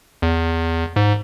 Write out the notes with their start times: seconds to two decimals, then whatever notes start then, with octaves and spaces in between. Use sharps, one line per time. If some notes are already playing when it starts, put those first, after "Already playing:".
0.22 E2
0.96 G#2